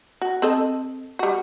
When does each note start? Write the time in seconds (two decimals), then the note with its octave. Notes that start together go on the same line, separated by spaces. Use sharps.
0.22 F#4
0.42 C4 A4 D#5
1.19 G3 F#4